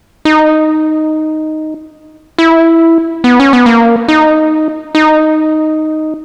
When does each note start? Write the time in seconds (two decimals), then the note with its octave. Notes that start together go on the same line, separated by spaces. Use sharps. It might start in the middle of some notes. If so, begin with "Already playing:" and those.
0.25 D#4
2.38 E4
3.24 B3
3.40 C#4
3.53 B3
3.66 A#3
4.08 D#4
4.95 D#4